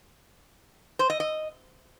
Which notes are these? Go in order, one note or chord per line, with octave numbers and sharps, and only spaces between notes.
C5
D#5
D#5